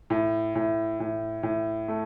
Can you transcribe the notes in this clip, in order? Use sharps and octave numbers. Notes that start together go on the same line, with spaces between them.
A2
A2
A2
A2
A3